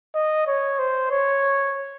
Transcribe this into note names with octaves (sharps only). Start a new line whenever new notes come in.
D#5
C#5
C5
C#5